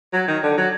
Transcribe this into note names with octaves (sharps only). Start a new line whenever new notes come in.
F#3
D#3
D3
F#3